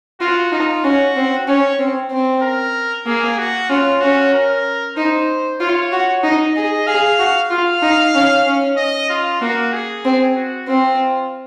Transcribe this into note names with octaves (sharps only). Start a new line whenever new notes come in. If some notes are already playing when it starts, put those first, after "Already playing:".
F4 F#4
D#4 F4
C#4 F#4
C4
C#4 C#5
C4
C4
A#4
A#3 G#4
F#4
C#4 F4
C#4 F#4
A#4
D#4 C5
F4 C#5
F#4
D#4 D#5
G#4 D#5
G#4 F5
F#4
F4 F5
D#4
C#4
C#4
D#5
F4
A#3 F#4
G#4
C4
F#4
C4 F4